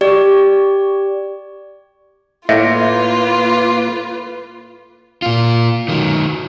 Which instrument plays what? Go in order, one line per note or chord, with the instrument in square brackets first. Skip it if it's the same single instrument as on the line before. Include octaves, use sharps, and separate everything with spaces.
[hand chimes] G4 D5
[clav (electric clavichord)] A2 [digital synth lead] A#3 [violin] F4 B4 [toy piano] E5
[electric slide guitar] A#2 F4
D#3 F#3